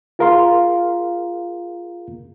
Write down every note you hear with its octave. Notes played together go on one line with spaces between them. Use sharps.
F4 G#4 A#4 F5 A#5 C6